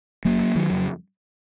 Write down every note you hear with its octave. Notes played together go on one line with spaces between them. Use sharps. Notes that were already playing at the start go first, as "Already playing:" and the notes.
F#1 F#3 A#3
D#3 F#3
F2 C#3